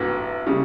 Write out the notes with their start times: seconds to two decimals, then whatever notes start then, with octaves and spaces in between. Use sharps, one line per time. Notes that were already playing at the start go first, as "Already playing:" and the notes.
Already playing: A1 G2 F#3 B3
0.46 C#3 G3